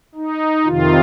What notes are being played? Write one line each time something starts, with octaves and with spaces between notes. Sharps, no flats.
D#4
F2 C3 D#3 F4